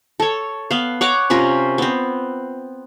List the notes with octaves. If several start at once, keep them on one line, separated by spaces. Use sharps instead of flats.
A4 C#5
B3 F5
C#5 F#5 A#5 D6
C3 C#4 F4 A#4
B3 C4